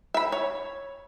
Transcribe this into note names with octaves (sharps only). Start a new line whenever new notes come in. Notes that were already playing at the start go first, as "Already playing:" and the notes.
E5 B5
C#5